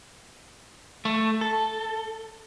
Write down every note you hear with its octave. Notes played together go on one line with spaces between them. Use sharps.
A3
A4